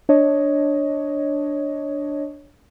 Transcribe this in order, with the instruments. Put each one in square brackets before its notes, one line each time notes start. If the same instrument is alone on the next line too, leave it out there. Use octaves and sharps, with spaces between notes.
[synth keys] D4 C#5 D#5